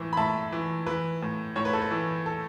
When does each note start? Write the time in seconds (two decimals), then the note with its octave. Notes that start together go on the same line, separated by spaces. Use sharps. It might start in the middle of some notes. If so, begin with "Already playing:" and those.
Already playing: A2 E3
0.13 B5
0.17 A2 E5 A5
0.52 E3
0.86 E3 B4
1.22 A2
1.56 A2 C#5
1.65 B4
1.73 A4
1.81 B4
1.91 E3
2.26 A4